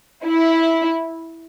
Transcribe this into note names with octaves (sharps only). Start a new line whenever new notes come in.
E4